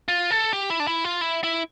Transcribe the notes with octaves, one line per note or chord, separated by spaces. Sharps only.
F4
A4
G4
E4
D4
E4
F4
E4
E4